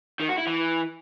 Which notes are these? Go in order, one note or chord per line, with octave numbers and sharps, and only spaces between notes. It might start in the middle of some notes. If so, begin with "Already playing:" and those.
D#3
F#4
E4
E3